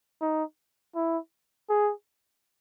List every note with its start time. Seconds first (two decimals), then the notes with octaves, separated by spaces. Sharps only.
0.21 D#4
0.95 E4
1.69 G#4